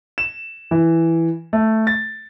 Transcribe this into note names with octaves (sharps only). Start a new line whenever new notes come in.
E7
E3
A3
A6